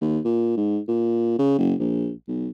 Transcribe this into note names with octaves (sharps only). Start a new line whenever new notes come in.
D#2
A#2
G#2
A#2
C#3
F#1
A#1
B1